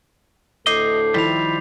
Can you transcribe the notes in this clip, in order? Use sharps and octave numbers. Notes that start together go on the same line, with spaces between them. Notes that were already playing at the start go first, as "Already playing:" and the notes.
D2 A2 A4 D#5 D6 G6 C7
D#3 F3 G3 E4 B6 F7